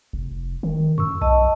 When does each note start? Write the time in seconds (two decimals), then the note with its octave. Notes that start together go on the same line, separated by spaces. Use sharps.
0.13 F1
0.63 D#3
0.98 F#2 C#6 E6
1.21 B1 D#5 A5